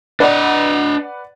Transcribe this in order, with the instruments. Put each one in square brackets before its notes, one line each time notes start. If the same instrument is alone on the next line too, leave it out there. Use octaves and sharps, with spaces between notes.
[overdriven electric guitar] D4 D#5 [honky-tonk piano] B4 D5 F#5